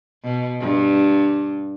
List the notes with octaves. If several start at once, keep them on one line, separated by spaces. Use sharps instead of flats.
B2
G2